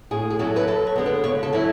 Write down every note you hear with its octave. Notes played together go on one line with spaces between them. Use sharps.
A2 G#4
G#4
F#3 C#4 E4 A4
B4
F#2 A4
C#5
D3 G#3 B3
B4
C#3 C#5
A4
F#3 C#4 E4